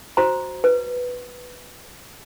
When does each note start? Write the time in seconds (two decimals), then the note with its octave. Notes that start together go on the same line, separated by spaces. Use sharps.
0.17 F#4 C5 A#5
0.64 B4